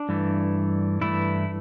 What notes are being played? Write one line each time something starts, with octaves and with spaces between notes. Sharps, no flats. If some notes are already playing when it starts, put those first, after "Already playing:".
Already playing: D4
G2 E3 A3
G2 E3 A3 E4